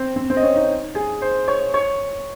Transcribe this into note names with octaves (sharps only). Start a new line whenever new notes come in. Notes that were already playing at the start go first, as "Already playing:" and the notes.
Already playing: C4 C5
C4 C5
C4 C5
D#5
C#4 C#5
D#4 D#5
G#4 G#5
C5 C6
C#5 C#6
C#5 C#6